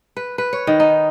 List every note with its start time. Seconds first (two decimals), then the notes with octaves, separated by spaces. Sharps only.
0.17 B4
0.38 B4
0.53 C#5
0.67 D#3
0.80 D#4